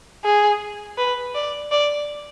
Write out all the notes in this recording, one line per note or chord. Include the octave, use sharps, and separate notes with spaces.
G#4
B4
D5
D5